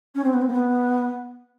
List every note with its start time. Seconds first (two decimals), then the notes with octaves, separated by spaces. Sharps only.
0.15 C#4
0.24 C4
0.33 B3
0.41 C4
0.48 A#3
0.52 B3